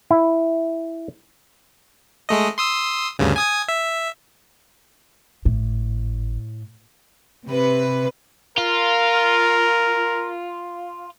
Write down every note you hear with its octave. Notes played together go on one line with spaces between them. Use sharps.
E4
G#3 A3 D#5
C6 D#6 E6
D2 G2 C#3
G#5 D#6 G#6
E5
G#1 A2
C3 B4
F4 A#4